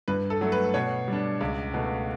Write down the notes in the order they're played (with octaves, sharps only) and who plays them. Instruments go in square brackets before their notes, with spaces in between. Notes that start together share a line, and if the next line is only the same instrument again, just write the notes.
[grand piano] G2 B4
A4
F#3 A3
B4
B2 C#5
G3 D4
C#2
B2 A3